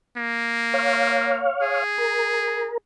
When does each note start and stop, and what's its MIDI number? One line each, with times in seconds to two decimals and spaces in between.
0.17 1.51 58
0.74 1.84 73
0.74 1.84 77
1.62 2.76 68
1.98 2.78 70